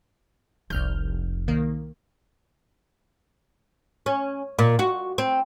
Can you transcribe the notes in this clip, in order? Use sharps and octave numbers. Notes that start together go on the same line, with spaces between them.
F1 C2 F6 G6
C2 D#3 A#3
C#4
A#2
F#4
C4